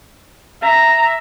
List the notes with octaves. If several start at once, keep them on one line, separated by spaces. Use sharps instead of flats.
E5 A#5